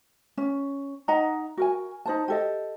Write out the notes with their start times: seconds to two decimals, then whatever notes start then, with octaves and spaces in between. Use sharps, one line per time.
0.37 C#4
1.08 D#4 D#5 F#5 A#5
1.57 F#4 A#4 G#5
2.06 D#4 C5 A5
2.28 G4 A4 D#5